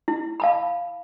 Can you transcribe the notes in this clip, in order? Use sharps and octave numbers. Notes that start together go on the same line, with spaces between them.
E4
F5 A5 B5